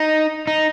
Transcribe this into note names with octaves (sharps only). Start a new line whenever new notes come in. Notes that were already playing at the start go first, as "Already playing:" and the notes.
Already playing: D#4
D#4